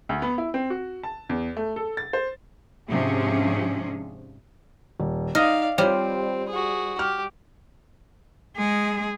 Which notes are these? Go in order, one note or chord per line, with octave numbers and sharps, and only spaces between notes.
D2
B3
E4
C4
F#4
A5
E2
A3
A4
A6
C5
G#2 C3 F3 C#4 D4 G#4
D#1
D#4 D5 D#5 F5 D#6 F6
G3 C4 F4 G4 C5 C#5 F6
F#4 G#4
G4 F6
G#3 G#4